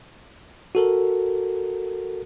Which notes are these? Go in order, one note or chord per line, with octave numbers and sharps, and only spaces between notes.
F#4 A4 A#4